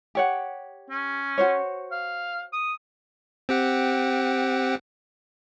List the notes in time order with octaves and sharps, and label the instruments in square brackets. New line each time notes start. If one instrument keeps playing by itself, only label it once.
[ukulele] G4 C#5 F#5
[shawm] C#4
[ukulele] F#4 C5 C#5
[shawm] F5
D#6
[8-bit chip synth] C4 G4 F#5